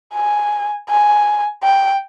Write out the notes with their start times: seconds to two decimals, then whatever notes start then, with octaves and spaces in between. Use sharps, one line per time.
0.15 G#5
0.89 G#5
1.63 G5